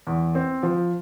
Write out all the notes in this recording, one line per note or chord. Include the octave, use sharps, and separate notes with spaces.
E2
C4
F3